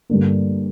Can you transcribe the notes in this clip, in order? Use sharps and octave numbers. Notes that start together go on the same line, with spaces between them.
G2 D3 A#3